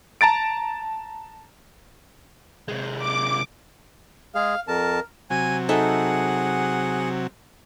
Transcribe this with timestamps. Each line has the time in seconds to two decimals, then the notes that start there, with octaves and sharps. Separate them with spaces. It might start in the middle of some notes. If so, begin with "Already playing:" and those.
0.21 A5 A#5 A6 D7
2.68 C3 G#3
2.98 D6
4.35 G#3 G#4 F5
4.68 F2 A#4 A5
5.30 C3 F#3 G#5
5.69 D#4 G#4 A4 E5 F#5